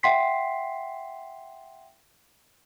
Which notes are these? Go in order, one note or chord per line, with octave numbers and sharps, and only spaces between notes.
E5 F#5 G5 C6 B6 C7